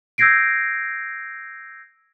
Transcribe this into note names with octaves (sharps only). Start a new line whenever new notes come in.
E6 G6 G#6 A#6 C7 D7